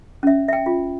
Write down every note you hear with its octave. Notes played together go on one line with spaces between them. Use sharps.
C#4 E5
E5 G5
F4